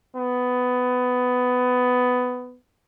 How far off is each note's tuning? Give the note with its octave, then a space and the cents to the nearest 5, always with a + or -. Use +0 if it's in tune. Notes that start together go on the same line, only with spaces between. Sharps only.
B3 +15